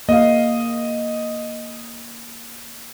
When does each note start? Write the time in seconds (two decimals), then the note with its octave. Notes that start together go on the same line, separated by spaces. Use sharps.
0.09 A#3 G#4 D#5 F5